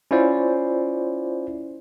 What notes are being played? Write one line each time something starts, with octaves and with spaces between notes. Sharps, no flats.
C#4 E4 F4 C5 D5